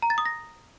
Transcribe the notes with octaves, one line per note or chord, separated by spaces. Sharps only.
A#5
A6
D#6
A#6